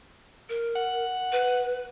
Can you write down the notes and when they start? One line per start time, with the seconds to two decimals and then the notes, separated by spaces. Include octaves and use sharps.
0.49 A#4
0.76 F#5
1.32 B4